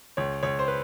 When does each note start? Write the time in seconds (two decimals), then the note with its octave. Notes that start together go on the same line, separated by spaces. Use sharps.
0.17 C#2 C#5
0.43 C#2 C#5
0.59 C5
0.68 B4